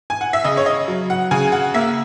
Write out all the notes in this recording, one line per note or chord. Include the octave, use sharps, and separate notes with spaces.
G#5
F#5
E5
C#3 D#5
C#5
D#5
F#3
F#5
C#3 G#5
F#5
A#3 E5